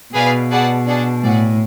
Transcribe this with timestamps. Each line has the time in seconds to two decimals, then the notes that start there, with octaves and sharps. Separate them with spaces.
0.14 B2 G#4 B4 D5 F5 G#5
0.51 G#4 B4 D5 F#5 A5
0.86 D4 G#4 D5 F#5 A5
1.23 A2 G#4 D5 F#5